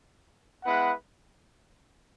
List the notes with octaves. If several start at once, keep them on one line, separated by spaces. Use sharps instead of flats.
G#3 B3 E4 B4 F#5